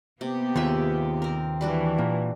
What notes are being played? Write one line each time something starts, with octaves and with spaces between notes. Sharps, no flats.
C3 A#3 B3 G4
D#2 F4 G#4 E5
C4 A#4
E3 G3 D4 F#4
A#2